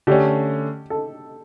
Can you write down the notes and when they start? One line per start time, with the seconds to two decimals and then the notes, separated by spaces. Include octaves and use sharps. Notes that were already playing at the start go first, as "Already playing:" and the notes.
0.07 D3 A3 C#4 G4
0.90 A4